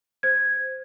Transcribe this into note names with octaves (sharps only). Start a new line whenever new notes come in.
C5 G#6